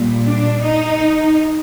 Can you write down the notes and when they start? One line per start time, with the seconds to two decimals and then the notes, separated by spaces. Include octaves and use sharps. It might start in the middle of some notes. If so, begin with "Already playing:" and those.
Already playing: A#2 G3
0.25 D4
0.64 D#4